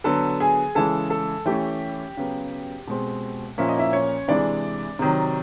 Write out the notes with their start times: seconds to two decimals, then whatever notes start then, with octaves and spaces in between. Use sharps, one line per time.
0.04 D3 F#3 B3 A4 A5
0.40 G#4 G#5
0.75 C#3 E3 G#3 A4 A5
1.10 A4 A5
1.46 E3 A3 C#4 G4 G5
2.17 C#3 F#3 B3
2.87 B2 G#3 C4
3.58 A#2 F3 A#3 C#4 E5
3.69 D#5
3.79 E4 E5
3.93 C#4 C#5
4.28 C3 E3 G#3 D4 D5
4.99 C3 D#3 F#3